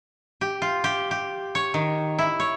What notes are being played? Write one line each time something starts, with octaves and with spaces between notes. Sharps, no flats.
G4
F4
G4
G4
C#5
D#3
E4
C#5